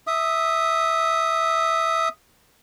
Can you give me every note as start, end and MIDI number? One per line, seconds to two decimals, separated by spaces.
0.07 2.09 76
0.07 2.09 87